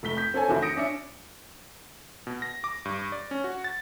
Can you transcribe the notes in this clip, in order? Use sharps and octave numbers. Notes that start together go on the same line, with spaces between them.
F1 A3 B6 G7
G6 B6
C4 A4 C#5 G#5
F1 D#3 D4 F#4 E5 C6
D#6 A#6 C#7 D7
C#4 D4 E5 C#7
B2
A#6
D6
G2
D5
C#4
F#4
A6